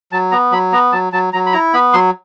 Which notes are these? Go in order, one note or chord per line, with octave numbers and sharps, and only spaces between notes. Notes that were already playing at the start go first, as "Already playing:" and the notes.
F#3 A5
B3 A#5
F#3 B5
B3 A#5
F#3 A5
F#3 A5
F#3 A#5
B5
E4 A#5
B3 B5
F#3 C6